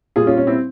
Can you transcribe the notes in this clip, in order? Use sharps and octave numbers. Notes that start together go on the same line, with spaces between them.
A#2 G3 F4 G#4
C#4 F4
C#4
C4 E4